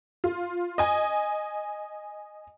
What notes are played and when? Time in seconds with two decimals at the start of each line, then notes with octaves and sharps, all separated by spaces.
0.24 F4
0.78 D#5 G#5